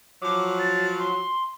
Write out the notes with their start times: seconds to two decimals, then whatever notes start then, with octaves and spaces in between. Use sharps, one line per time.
0.22 F3 F#3 D6
0.59 A6
1.00 C6